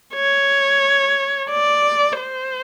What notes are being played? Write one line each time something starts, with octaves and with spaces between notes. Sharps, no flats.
C#5
D5
C5